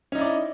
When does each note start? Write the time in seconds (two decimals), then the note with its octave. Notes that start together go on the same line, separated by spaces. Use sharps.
0.12 C#4
0.15 D#4
0.18 E4
0.21 D5
0.24 D#5